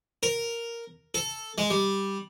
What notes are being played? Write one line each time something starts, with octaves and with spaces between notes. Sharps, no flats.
A#4
A4
G#3
G3